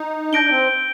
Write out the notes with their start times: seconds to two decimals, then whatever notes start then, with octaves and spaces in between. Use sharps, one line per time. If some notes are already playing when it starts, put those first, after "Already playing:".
Already playing: D#4
0.32 D4 G6 A#6 D7 G7
0.44 D4
0.50 C4